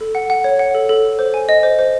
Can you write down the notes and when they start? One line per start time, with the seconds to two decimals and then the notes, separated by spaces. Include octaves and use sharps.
0.01 A4
0.15 F#5
0.30 F#5
0.44 C#5
0.59 F#5
0.75 A4
0.89 A4
1.04 A4
1.19 C5
1.34 G#5
1.49 D#5
1.63 C5
1.79 C5